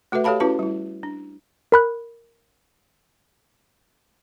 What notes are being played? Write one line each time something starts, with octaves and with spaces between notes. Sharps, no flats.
A3 F#4 A4 B4 E5
G4 A4 C#5 F5 A5 B5
C#4 E4 F#4 B4 A5
G3 E4
D4
A#4 B5 F#6